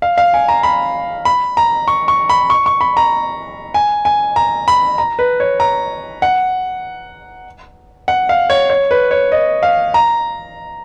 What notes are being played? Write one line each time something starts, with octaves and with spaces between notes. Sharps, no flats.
F5
F5
G#5
A#5
B5
B5
A#5
C#6
C#6
B5
C#6
C#6
B5
A#5
G#5
G#5
A#5
B5
A#5
B4
C#5
A#5
F#5
F#5
F5
C#5
C#5
B4
C#5
D#5
F5
A#5